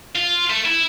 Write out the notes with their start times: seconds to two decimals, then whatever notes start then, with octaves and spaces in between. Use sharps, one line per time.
0.16 F4
0.50 A3
0.65 E4